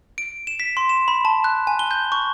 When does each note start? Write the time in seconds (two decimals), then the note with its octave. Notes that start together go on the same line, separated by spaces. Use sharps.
0.18 D7
0.47 E7
0.60 B6
0.77 C6
0.89 E7
1.08 B5
1.25 A5
1.44 F#6
1.67 G#5
1.79 G7
1.91 G6
2.12 C#6